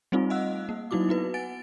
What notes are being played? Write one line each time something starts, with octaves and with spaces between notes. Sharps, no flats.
G3 A3 C4 D#4 F4
D#5 F5 F#5 E6 F#6
A#3
F#3 D#4 E4 F#4 D6
B3 F#4 B4
F#5 G#5 A6 D7